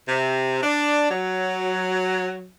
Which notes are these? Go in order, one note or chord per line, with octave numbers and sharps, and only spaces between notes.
C3
D4
F#3